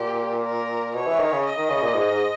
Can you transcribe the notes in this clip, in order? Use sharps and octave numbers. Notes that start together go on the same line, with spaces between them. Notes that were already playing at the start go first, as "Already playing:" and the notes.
Already playing: A#2 G4
A#4
B2 C#5
E3
D#3
C#3
D#5
D#3
C#3
A#2
G#2
G#2